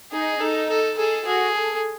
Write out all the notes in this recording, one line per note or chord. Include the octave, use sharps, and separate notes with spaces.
D#4 G#4
D#4 A4
A4
G#4 A4
F#4 G#4
A4